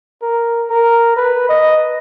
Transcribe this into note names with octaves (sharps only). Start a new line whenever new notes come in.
A#4
A#4
B4
D#5